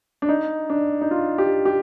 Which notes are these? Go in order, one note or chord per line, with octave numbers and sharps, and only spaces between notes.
D4
D#4
D4
D#4
F4
G4
G4